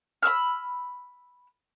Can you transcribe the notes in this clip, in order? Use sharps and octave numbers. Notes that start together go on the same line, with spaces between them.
B5 C#6 E6 F6